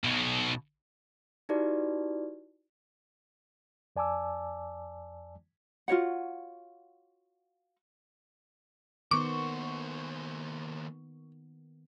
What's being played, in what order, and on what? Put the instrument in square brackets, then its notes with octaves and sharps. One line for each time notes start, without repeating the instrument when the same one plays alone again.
[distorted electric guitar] B1 B2
[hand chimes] D#4 E4 F#4 G4 B4 D5
[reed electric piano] F2 D5 G#5 A5 D6 E6
[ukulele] F4 F#4 C#5 F#5
[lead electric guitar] D#2 C5 [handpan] D#3 B3 [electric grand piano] C#6 [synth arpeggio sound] D6